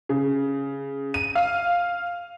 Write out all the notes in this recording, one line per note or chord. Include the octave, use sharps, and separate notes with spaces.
C#3
D#7
F5